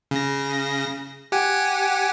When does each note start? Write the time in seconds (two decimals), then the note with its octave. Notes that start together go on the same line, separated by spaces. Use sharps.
0.11 C#3 A#6
1.32 G4 F#5 G#5